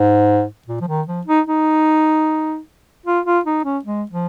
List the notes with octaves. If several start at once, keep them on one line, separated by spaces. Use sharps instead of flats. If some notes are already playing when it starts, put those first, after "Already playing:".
Already playing: G#2
A#2
F3
D#3
F3
D#4
D#4
F4
F4
D#4
C#4
G#3
F3